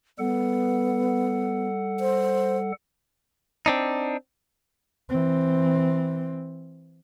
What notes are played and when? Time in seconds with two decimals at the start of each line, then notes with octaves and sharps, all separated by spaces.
0.19 G3 B3 A4 F#5
2.00 C5
3.66 C4 D4 D#4
5.09 E3 C4